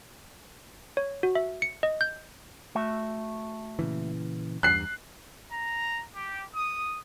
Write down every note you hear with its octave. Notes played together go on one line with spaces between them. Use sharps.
C#5
F#4
E5
C#7
D#5
G6
A3 F#4 E5
A#2 C#3 E3
E2 G2 F#6 C7
A#5
G4
D#6